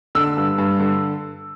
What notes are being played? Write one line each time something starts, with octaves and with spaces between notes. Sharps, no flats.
D3 E6
G2
G2
D3